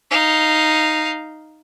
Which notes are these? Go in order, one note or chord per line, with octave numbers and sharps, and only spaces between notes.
D#4 F5